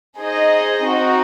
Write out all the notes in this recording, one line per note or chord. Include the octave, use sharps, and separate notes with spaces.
D#4 G#4 C5 D#5
C4 D#4 F#4